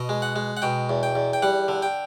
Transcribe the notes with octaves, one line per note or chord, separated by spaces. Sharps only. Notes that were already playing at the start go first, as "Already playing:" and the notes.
Already playing: B2 D#5
G#3
F#5
G#3
F#5
B2 G5
E2
G5
E2
G5
G3 F#5
D3
G5